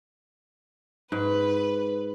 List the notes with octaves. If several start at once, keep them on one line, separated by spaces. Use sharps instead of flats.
G#2 B4